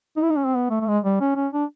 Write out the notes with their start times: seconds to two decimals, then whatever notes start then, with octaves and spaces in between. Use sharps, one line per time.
0.17 D#4
0.22 E4
0.30 D#4
0.37 C#4
0.46 C4
0.55 B3
0.70 A3
0.80 A3
0.87 G#3
1.04 G3
1.21 C#4
1.36 C#4
1.53 D4